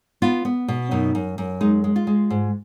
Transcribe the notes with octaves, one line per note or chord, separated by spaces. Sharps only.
B3 F4
B3
B2
F#2 D#4
F#2
F#2
G#3 D#4
G#3
F4
G#3
G#2